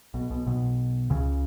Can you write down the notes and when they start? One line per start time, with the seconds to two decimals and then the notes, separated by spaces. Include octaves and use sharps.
0.14 B1 B2
0.31 B1 B2
0.46 B1 B2
1.10 C#2 C#3